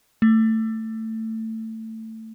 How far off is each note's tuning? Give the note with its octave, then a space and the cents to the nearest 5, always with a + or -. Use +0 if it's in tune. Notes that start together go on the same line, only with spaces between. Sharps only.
A3 +20